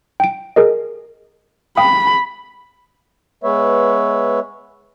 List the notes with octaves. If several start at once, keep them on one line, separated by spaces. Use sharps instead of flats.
G5 D7
G#4 A#4 D#5
F5 G5 B5 D#6
G#3 B3 B4 C#5 E5